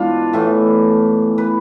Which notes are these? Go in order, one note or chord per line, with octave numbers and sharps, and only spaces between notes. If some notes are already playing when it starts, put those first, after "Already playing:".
Already playing: G#2 E3 B3 D4 F4
A2 E3 B3
B4